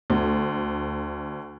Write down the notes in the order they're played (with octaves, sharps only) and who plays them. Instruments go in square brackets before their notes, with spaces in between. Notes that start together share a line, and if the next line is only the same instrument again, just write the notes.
[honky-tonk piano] D2